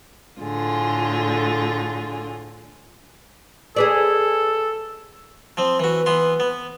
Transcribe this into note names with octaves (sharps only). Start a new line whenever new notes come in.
A2 D3 F4 G#4
G#4 A4 B4 D5
F3 C4
E3 F#4 B4
E3 B3 C6
B3